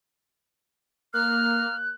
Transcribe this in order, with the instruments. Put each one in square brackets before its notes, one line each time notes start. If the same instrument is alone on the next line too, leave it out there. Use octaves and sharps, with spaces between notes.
[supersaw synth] A#3 [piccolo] F6 [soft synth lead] F#6